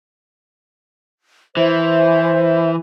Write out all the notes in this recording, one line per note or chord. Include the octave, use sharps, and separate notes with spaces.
E3 C5 E5